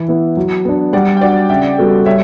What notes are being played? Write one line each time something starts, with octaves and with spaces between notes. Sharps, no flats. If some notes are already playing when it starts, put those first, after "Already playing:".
Already playing: E3
B3 E4
F#3
B3 D4
G3 D5 F#5
G5
D4 F#4 D5 F#5
C#3 E5 G5
G3 B3 F#4 A4
G3 C#5 E5